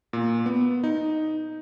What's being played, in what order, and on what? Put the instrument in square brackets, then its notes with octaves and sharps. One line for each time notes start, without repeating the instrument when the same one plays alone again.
[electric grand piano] A#2
B3
D#4